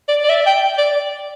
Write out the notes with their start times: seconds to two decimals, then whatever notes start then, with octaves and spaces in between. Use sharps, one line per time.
0.08 D5
0.23 D5
0.29 E5
0.46 G5
0.78 D5